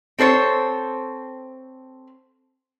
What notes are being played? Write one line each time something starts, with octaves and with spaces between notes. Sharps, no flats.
C4 A4 C5 C#5